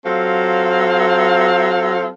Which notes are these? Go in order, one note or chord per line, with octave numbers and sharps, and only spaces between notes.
F#3 C4 F4 A4 F5